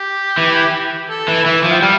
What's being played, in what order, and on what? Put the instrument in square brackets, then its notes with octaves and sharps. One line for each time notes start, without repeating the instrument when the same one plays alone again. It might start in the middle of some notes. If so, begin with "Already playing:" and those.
Already playing: [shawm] G4
[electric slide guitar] E3
[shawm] A4
[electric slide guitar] E3
[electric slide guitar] E3 [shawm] E5
[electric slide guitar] F3
[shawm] G5
[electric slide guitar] G3 [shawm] F5